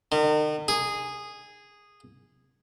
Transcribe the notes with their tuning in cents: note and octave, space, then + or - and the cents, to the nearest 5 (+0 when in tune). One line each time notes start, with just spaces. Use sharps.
D#3 -40
G#4 -10